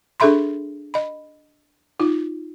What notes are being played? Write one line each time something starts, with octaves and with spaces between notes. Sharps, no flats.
D4 G#4 A4 E5 B5 C6
D#5 B5
D#4 F4